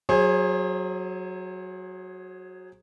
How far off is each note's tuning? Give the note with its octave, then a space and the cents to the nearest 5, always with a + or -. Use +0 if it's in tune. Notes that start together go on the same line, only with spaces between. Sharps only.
F#3 +0 G#4 +0 C5 +40